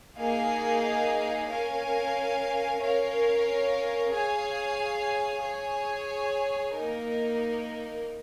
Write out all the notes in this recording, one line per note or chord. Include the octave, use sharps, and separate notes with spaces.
A#3 D#4 G#4 F5 G#5
C#4 A#4 F5 G#5
C#4 A#4 C#5 F5
G#4 C#5 F5 G#5
G#4 C#5 G#5
A#3 D#4 A#4